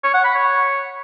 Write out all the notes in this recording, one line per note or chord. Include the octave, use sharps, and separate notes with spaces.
C#5
F#5
B5
C#5